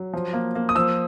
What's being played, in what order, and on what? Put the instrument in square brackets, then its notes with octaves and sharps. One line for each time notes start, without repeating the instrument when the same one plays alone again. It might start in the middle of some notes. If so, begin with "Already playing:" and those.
Already playing: [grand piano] F#3
F3
A#3
A#3
D#6
F3 E6